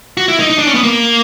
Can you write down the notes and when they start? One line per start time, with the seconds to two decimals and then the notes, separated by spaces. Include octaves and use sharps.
0.17 F#4
0.28 E4
0.40 D#4
0.50 D#4
0.59 D4
0.67 C#4
0.74 B3
0.84 A#3